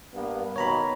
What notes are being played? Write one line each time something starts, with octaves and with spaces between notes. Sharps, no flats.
G2 A#3 B3
B2 D#3 A#3 C#5 A#5 B5